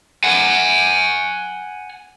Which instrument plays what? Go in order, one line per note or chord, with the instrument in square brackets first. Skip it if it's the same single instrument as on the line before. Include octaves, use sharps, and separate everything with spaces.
[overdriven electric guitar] F#5 G#5